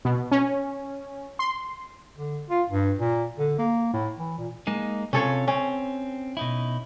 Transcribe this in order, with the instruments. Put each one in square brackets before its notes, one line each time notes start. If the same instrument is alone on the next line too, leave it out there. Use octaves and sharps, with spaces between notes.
[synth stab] B2
C#4
C6
[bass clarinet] D3
F4
G2
A#2
D3
A#3
A2
E3
A#2
[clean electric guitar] G#3 A#3 D#4
[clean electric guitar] C3 F4 [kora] C#4 A4 C#5
[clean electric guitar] C4 [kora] C#4
[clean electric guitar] B2 D#4 E4